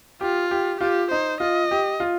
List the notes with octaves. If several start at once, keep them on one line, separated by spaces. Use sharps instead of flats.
F4 G4
G4
F4 G4
D#4 C5
F4 D#5
G4
F4